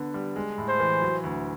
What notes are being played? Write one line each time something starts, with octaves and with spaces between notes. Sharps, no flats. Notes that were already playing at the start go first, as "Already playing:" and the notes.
Already playing: D3 B3
G3
G#3
A2
C5
E3
F#3
D2